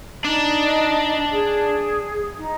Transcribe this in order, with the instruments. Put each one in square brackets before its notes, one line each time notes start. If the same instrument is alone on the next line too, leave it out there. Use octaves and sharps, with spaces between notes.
[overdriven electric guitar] D4 [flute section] D#4 D#5
[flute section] G#4
D#4